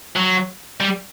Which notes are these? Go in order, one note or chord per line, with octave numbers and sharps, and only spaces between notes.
F#3
G3